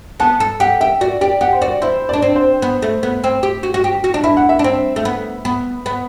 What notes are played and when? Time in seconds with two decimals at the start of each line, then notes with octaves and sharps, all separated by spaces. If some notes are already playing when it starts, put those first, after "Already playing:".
0.20 B3 A5
0.40 A4
0.60 G4 F#5
0.81 G4 E5
1.01 F#4 D5
1.21 G4 D5
1.41 G4 F#5
1.53 C5
1.61 F#4 D5
1.82 E4 C5
2.09 D4 D5
2.22 C4
2.36 C5
2.62 B3
2.82 A3
3.03 B3
3.24 C4
3.43 G4
3.63 F#4
3.74 F#4
3.84 G4
4.04 F#4
4.14 D4
4.24 E4 E5
4.37 F#5
4.49 E5
4.59 D4
4.64 C4
4.96 A3
5.05 B3
5.45 B3
5.86 B3